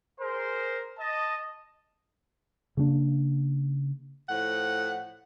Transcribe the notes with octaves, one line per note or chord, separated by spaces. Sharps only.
G#4 A#4 C5
D#5 A5
C#3 A#3 C4 D4
A2 F3 F#5